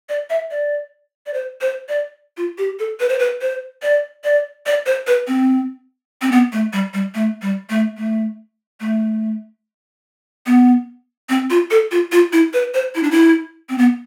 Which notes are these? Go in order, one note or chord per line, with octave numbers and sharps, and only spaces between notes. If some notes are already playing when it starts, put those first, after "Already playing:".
D5
E5
D5
D5
C5
C5
D5
F4
G4
A4
B4
C5
B4
C5
D5
D5
D5
C5
B4
C4
C4
B3
A3
G3
G3
A3
G3
A3
A3
A3
B3
C4
F4
A4
F4
F4
E4
B4
C5
E4
D4
E4
C4
B3